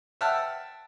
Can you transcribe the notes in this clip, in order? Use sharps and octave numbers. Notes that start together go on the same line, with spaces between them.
E5 F#5 G5 A5 E6 F6